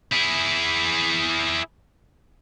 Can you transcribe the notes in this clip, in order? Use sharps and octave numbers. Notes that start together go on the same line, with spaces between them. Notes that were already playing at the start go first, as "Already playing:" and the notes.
E4 G#4